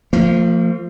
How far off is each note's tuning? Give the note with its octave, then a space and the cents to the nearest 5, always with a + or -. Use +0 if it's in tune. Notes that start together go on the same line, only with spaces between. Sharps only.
F3 +0 A#3 -45